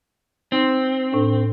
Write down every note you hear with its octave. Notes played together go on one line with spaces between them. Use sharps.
C4 D#4
A2 D4